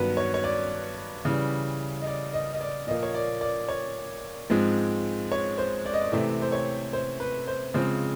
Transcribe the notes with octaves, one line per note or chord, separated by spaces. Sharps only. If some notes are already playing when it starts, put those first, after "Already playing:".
Already playing: G2 D#3 F#3 B3 B4
C#5
C#5
D5
C#3 E3 G3
D#5
D5
D#5
D#5
D5
A#2 F3 A#3 D#5
C#5
D5
D5
C#5
G#2 F3 G#3 C4
C#5
C5
D5
D#5
D5
C3 E3 A3 C4
C5
C#5
C5
B4
C5
C#3 F3 G#3 C4 C5